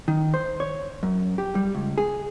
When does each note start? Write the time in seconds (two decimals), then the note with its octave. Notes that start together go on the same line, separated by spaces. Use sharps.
0.08 D#3
0.34 C5
0.60 C#5
1.03 F#2
1.38 G4
1.55 G3
1.75 C#2
1.98 G#4